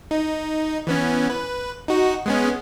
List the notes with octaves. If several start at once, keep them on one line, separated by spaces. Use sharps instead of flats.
D#4
E3 B3 C#4
B4
D#4 F#4
G#3 B3 C#4